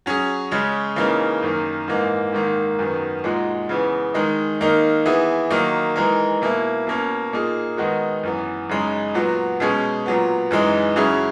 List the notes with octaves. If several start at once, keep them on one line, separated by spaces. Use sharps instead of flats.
F#3 C#4 G#4
C#3 G#3 C#4
C#3 E3 A#3 D#4
F#2 D#3 A#3
G#2 E3 A#3 D#4
G#2 D#3 A#3
F#2 D#3 F#3 B3
A#2 G#3 D#4 F#4
C#3 E3 B3
D#3 G#3 D#4
D#3 A#3 D#4
E3 B3 E4 G#4
D#3 F#3 A#3 D#4
E3 G#3 D#4 A#4
B2 A#3 E4
B2 A#3 C#4
A#2 A#3 D#4 G#4
D#3 G#3 B3 D#4 F#4
F#2 E3 B3
F#2 C#3 G#3 D#4
A#2 F#3 B3 F#4
B2 G#3 C#4 G#4
A#2 F#3 B3
F#2 E3 G#3 D#4
C#3 F#3 C#4 E4 G#4